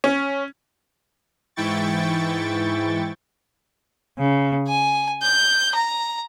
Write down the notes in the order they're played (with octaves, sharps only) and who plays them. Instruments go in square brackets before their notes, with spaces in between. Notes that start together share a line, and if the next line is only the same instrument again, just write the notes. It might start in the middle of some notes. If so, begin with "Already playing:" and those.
[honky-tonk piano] C#4
[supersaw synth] G#2 E3 E4 G5 C#6 A6
[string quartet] C#3
G#5
G6
A#5